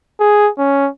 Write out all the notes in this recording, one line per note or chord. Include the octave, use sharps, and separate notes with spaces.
G#4
C#4